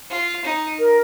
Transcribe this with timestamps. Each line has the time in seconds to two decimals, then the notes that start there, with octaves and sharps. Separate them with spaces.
0.10 F4
0.44 D#4
0.79 A#4